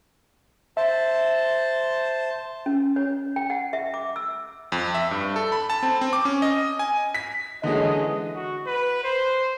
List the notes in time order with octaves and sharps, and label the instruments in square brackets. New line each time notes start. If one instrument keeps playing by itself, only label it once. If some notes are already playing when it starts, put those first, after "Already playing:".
[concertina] C5 A5 [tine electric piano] E5
[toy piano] C#4
C#5
G5
F#5
E5
D6
E6
[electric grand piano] F2
E5
G2
A4
B5
A5
C4
C4
D6
C#4
D#5
G#5
[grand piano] B6
[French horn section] F#2 D#5 [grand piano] D3 E3 G#3
[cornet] F#4
B4
C5